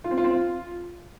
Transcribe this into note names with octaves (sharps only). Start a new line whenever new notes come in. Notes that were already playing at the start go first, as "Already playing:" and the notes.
F4
C4
F4
C4
F4